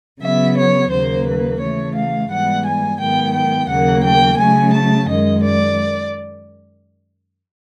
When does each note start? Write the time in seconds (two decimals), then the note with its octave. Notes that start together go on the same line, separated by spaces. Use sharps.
0.21 C#3 F#3 B3 E5
0.56 C#5
0.91 D#2 C#3 F#3 A#3 C5
1.25 B4
1.60 C#3 E3 A3 C#5
1.95 F5
2.30 G#2 E3 G3 B3 F#5
2.65 G#5
2.99 G#2 D#3 F#3 B3 G5
3.34 G5
3.69 D#2 C#3 F#3 A#3 F#5
4.03 G5
4.38 C#3 F#3 A3 C#4 G#5
4.73 A5
5.08 F#2 D#3 G#3 D#5
5.42 D5